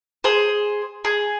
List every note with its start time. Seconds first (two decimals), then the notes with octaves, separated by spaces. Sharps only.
0.24 G#4 C5
1.05 G#4